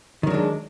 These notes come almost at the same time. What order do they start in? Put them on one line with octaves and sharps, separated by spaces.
D#3 F#3 D4 G#3